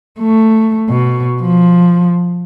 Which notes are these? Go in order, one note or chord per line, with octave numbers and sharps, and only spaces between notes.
A3
B2
F3